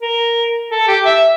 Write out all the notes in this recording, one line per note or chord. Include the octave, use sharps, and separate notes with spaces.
A#4
A4
G4
E5